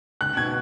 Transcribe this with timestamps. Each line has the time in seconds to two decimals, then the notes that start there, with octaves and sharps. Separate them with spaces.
0.21 C#2 F#6
0.37 B2 G#6